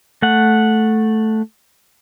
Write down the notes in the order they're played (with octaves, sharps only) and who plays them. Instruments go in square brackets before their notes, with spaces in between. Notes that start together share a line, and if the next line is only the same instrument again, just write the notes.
[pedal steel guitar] A3 F#5